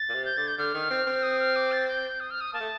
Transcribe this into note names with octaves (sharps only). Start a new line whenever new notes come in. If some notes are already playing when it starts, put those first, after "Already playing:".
Already playing: A6
A#2
C3
G6
D3 A6
G6
D3 F6
D#3
C4
C4
D#6
F6
D6
A6
G6
D#6
F6
D#6
A#3 A5
A3